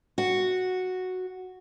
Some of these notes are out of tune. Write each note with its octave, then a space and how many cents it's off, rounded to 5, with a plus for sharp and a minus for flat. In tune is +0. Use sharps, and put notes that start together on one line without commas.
F#4 -5